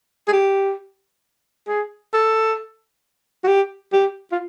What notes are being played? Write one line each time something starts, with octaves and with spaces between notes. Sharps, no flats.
G#4
G4
G#4
A4
F#4
G4
G4
F4